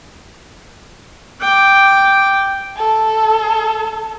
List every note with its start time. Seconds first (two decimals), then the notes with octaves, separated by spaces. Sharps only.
1.41 G5 D6
2.76 A4